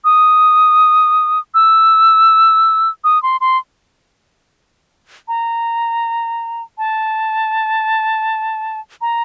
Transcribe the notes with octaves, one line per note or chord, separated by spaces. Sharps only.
D#6
E6
D#6
C6
C6
A#5
A5
A#5